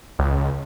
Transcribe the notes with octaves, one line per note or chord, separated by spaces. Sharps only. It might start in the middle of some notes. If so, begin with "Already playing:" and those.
C#2